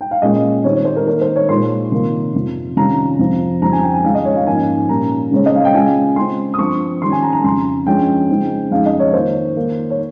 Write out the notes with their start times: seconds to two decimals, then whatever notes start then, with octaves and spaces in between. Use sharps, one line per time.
0.01 G5
0.11 F5
0.22 A#2 G#3 C#4 F4 D#5
0.64 D#3 G3 C4 D#4 C#5
0.75 C#5
0.85 C5
0.96 A#4
1.07 D#3 A#3 D#4 A#4
1.21 C5
1.36 C#5
1.49 A#2 G#3 D#4 C6
1.92 C3 D#3 A#3
2.35 F2 C3 F3
2.77 C3 D#3 G3 C#4 F4 A#5
3.19 F2 C3 F3 C4 F4
3.61 F2 C#3 G3 C4 D#4 A#5
3.72 G#5
3.83 G5
3.93 G#5
4.04 C#3 G#3 C#4 F4 F5
4.15 D#5
4.25 C#5
4.36 F5
4.46 G#2 F3 A#3 C#4 G#5
4.89 A#2 G3 A#3 C#4 A#5
5.31 C#3 G#3 C4 C#5
5.46 D#5
5.55 F5
5.65 G5
5.74 C#3 G#3 C#4 F4 G#5
6.16 C#3 G#3 C4 C6
6.54 D#6
6.58 G2 F3 C4 C#6
7.02 D#3 G3 C#4 C6
7.12 G#5
7.22 A#5
7.33 A#5
7.44 F2 C#3 F3 C6
7.86 G2 F3 G#3 C#4 F4 G5
8.29 C#3 G#3 C4 D#4
8.71 F2 C#3 G#3 D#4 F5
8.86 D#5
9.00 C#5
9.13 D#3 A#3 F4 C5
9.56 D#3 A#3 D#4
9.90 C#5